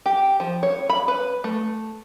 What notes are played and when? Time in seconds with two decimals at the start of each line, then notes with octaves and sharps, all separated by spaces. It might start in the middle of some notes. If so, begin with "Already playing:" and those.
0.06 G4
0.40 F3
0.63 C#5
0.89 B5
1.08 B4
1.44 A3